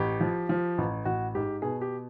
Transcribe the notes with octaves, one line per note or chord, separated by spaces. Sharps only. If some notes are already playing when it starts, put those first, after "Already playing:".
Already playing: A1 G4
F3
F3
A1
A1 F#4
G#2 G4
B2 G#4
G4